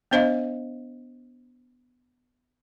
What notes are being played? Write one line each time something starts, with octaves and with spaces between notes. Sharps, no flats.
B3 D4 C5 D#5 F5